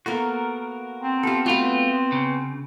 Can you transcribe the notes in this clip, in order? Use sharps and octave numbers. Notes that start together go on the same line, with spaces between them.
A#3 B3 F#4 A4 A#4
C4
B3 F4 G4 A4
A3 B3 F4 F#4 B4
C#3